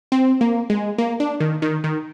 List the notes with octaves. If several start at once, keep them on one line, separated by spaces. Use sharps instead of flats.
C4
A#3
G#3
A#3
D4
D#3
D#3
D#3